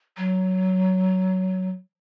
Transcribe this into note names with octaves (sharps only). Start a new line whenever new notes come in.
F#3